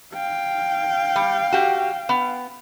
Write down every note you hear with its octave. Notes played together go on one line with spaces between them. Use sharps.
F5 G5
G3
F#4 G4
B3